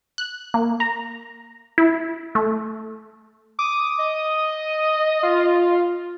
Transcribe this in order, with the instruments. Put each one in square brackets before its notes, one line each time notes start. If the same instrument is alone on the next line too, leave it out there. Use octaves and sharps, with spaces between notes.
[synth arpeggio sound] F#6
A#3
A#5
E4
A3
[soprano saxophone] D6 [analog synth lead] D#6
[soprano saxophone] D#5
[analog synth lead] F4